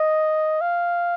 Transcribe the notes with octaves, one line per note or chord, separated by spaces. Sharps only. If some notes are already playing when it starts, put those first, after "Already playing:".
Already playing: D#5
F5